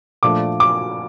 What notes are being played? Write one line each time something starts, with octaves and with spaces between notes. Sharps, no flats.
A#2 F3 A3 D4 D6
D6